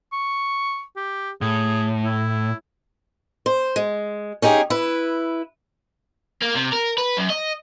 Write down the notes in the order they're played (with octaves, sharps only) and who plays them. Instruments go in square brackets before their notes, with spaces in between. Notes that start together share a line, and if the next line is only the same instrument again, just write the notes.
[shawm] C#6
G4
[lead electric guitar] A2 [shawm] G#4
[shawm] E4
[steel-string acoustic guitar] C5
G#3
C#4 D#4 G4 G#4
E4 B4
[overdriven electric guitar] A#3
C3
A#4
B4
F#2
D#5